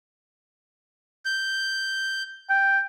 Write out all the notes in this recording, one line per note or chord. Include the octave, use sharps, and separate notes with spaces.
G6
G5